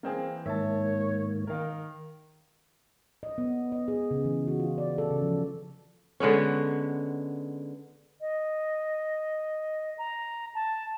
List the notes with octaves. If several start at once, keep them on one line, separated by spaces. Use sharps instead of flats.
E3 A#3 C4 G#4
G#2 D#3 A#3 C#5 E5 A5
D#3 A#4 F5
D#5
B3
D#5
G#4
C#3
E3
F#4
F4
D5
A4
C#3
F3
D3 G#3 B3 C#4
D#5
A#5
A5